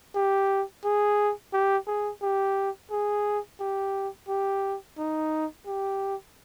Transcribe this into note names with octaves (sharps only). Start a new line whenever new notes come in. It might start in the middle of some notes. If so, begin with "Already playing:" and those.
G4
G#4
G4
G#4
G4
G#4
G4
G4
D#4
G4